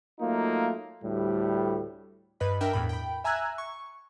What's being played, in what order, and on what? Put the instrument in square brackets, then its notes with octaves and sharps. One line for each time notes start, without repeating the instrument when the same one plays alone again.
[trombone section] F#3 A3 A#3 D#4 F4
D2 A2 G3
[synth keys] G2 B4 D#5 B5
D4 A#4 E5 G5
E2 A2 B5
G5 B5
E5 G#5 A#5 E6 F#6 G#6
C#6